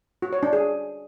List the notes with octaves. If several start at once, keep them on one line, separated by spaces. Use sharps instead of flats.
F#4
C#5
D4
G#4